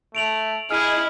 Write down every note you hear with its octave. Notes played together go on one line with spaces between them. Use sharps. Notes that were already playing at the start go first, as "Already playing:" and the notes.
A3 D7 F7 F#7
E4 G#4 D#5 F6